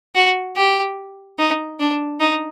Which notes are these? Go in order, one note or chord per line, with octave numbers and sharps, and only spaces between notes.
F#4
G4
D#4
D4
D#4